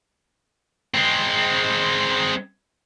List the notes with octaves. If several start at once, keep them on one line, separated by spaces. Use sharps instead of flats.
G#3 C4